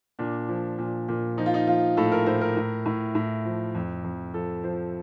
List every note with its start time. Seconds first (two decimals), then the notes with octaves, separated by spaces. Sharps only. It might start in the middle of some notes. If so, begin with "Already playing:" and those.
0.19 A#2 D4
0.49 F3
0.79 A#2
1.09 A#2
1.37 F3 D#4
1.46 F4
1.54 D#4
1.67 F3 F4
1.97 A2 A4
2.12 A#4
2.26 A2 C5
2.41 A#4
2.57 A2
2.86 A2
3.15 A2
3.45 F3
3.75 F2
4.04 F2
4.34 F3 A4
4.64 F3 C5